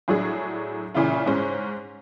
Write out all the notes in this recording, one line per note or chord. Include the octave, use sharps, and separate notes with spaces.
A2 F#3 D4 G#4
A#2 C#3 E3 E4 F4
G#2 C#4 C5